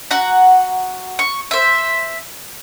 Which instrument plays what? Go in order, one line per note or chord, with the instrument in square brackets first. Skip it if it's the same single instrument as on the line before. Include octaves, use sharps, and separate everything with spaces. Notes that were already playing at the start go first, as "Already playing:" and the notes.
[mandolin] F#4 F#5 A#5
C#6
C5 E5